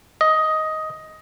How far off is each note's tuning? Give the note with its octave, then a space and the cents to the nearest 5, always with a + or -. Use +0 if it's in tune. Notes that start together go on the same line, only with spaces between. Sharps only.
D#5 +10